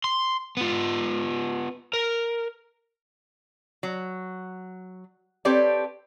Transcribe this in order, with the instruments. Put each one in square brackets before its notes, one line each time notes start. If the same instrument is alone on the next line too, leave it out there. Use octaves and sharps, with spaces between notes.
[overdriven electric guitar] C6
B3 F4
A#4
[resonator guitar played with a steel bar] F#3
C4 G4 A4 B4 C#5 D5